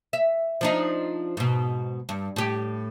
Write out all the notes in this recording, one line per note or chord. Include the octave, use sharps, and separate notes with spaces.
E5
F3 D4 D#4
G#2 B2
G2
A2 G4